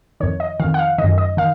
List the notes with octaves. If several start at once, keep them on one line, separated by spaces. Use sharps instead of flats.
F2 D#3 C#5
D#5
F2 D#3 F5
F#5
F5
D#3 D#5
F#2
D#5
D#3 F5